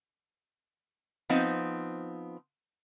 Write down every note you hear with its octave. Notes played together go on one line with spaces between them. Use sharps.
F3 B3 C4 D#4